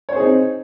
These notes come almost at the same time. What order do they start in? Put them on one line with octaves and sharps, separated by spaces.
C#5 C5 G#4 D#4 C4